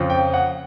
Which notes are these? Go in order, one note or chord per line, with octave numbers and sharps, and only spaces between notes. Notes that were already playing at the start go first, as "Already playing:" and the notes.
Already playing: F2 C#3 F3
G5
F#5